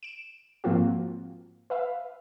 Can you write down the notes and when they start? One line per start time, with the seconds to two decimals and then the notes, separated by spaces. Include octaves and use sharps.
0.03 D7 E7
0.64 G#2 F3 A#3 C4 F4 F#4
1.70 B4 E5 F5